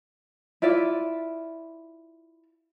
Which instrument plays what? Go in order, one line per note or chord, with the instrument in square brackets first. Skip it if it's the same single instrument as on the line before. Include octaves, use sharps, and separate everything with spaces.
[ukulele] E4 F4 D5 E5